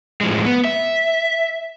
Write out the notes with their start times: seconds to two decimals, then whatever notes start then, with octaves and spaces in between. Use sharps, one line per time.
0.21 A2 F3 G#3
0.45 B3
0.64 E5